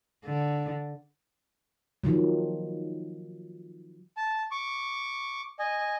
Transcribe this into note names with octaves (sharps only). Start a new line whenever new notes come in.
D3
D#3 F3 F#3
A5
C#6 D6
D#5 G#5